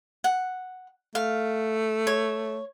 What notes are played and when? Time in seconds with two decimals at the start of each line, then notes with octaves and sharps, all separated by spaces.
0.24 F#5
1.15 A3 F5
2.07 C#5